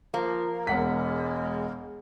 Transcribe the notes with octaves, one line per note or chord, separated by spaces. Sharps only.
F3 A#3
E1 G#3 F#5 B6